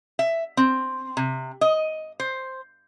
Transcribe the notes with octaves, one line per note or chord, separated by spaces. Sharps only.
E5
C4
C3
D#5
C5